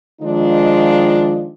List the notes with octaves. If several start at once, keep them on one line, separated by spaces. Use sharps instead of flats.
D#3 F3 G#3 D4 D#4 F4